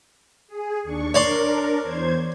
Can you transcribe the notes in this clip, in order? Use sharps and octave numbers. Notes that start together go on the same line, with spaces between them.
G#4
D#2 D4 C#6
D4 A#4 C#5 D5 C6
E2 C5 G#6